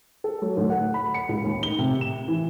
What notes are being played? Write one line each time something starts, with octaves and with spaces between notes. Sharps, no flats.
A4
F#3
D2
F#5
B5
C#7
C#2
D#2
G7
C3
E7
E3